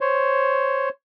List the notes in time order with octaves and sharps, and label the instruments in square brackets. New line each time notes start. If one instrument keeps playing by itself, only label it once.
[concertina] C5 C#5